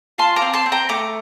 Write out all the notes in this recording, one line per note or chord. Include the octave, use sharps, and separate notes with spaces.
F4 A5 C6
A#5 D6
C4
A5 C6
C4
G5 A#5
A3 A#5 D6